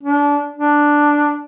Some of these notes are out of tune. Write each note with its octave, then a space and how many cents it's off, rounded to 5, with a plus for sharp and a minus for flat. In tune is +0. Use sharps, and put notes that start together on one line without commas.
D4 -25
D4 +0